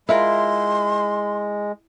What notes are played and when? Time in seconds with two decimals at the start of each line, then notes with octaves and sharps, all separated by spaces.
0.09 G#3 E4 F4 A#4 C6